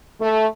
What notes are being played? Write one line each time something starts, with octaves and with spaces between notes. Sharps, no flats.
A3